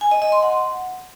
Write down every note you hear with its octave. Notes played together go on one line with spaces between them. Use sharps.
G#5
D#5
D#5
C6
F#5